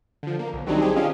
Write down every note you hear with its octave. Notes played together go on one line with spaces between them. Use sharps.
D3 F3
A#3
B1
D#3 F#3 G3 C4 D4 D#4
C4 G4 G#4
C#4 D4 F4 D#5 F5